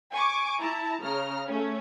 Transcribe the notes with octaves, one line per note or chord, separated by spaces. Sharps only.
G#5 C#6 D6
E4 A5 A#5
C#3 A#5 F6
A3 C#4